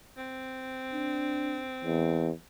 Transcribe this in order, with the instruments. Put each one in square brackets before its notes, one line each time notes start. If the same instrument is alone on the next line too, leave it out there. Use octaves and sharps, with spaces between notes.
[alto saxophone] C4
[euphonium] D4
E2